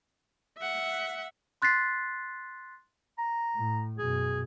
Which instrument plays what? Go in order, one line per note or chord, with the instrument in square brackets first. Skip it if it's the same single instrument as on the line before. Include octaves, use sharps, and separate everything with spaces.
[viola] E5 F#5
[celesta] C6 F#6 A6 B6 C7
[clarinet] A#5
[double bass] A2
[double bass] F#2 B2 [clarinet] G#4